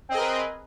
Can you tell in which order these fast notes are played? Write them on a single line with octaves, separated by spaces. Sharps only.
C4 D#5 G#4 A#4 B4